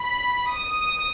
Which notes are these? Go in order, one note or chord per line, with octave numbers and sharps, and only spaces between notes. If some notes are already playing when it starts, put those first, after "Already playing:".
Already playing: B5
D#6